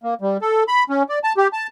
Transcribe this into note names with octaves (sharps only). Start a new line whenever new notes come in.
A#3
G3
A4
B5
C#4
D5
A5
G4
A5